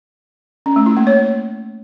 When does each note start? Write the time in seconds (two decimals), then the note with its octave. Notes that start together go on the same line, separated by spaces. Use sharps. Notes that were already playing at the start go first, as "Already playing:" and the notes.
0.66 C#4
0.76 A3
0.86 E4
0.97 A#3
1.07 C#5